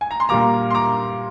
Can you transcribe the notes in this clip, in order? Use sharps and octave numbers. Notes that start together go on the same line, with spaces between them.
G#5
A#5
C6
A#2 G3 A#3 A#5 D6
C6
A#5 D6